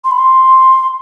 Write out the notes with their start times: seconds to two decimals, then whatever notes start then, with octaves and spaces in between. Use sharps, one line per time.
0.04 C6
0.11 B5
0.18 C6